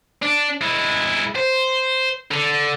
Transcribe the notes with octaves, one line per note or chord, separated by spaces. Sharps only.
D4
G#3 E4
C5
D3